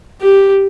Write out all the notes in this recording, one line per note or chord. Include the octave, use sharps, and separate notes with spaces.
G4